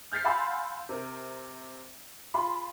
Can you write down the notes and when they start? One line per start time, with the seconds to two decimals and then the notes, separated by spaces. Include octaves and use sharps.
0.12 F6 G6 A6 B6 C7
0.24 F5 F#5 G#5 B5 C6 E6
0.89 C3 A#4
2.34 F4 G#4 B5 C6